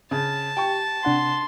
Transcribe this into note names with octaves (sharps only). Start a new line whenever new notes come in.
C#3 A5
G4 G5 C#6
C3 D4 F#5 C6